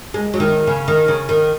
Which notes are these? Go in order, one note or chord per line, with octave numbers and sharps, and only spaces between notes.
G#3
F#3
D#3
C#3
D#3
C#3
D#3